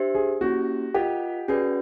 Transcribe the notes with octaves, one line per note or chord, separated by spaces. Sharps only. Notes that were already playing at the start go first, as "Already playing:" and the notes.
Already playing: D4 G4 C5 E5
G#4
A#3 C#4 E4 F#4 G4
F4 G4 A#4 D#5 F#5
C#4 F#4 G#4 B4 D5 G5